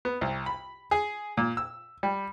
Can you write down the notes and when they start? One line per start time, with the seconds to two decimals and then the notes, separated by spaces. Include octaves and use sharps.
0.05 B3
0.21 C2
0.46 B5
0.91 G#4
1.37 A#2
1.57 E6
2.03 G3